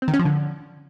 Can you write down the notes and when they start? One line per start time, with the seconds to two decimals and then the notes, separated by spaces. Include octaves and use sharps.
0.02 C4
0.08 D#3
0.14 C#4
0.19 F3
0.25 D3